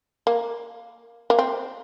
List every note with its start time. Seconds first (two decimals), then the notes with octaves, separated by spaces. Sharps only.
0.27 A#3
1.30 A#3
1.39 C4